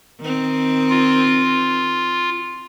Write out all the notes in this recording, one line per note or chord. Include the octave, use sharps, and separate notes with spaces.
D#3 C4
F4